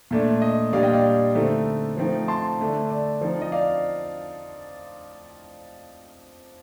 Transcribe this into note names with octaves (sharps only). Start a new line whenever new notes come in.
A#2 A3 D4
D#5
A#2 G3 D4 D5 F5
D#5 G5
D5 F5
D3 A3 C4 D#4
F3 A3 C4 D#4
A5 C6
D3 A3 D4
D5
F3 C4 D#4
D#5
D5 F5